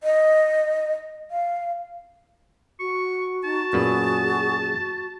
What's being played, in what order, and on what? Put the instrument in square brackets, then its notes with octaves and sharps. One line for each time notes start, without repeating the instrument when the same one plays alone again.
[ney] D#5
F5
[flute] F#4 [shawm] C#6
[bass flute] D#4 [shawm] A5
[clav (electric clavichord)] F#2 A#2 B3 [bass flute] G#4